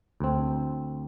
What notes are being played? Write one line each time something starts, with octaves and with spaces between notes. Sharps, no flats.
D2 C4